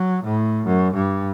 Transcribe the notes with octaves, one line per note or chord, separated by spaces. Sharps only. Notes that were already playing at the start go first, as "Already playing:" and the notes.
Already playing: F#3
A2
F#2
G2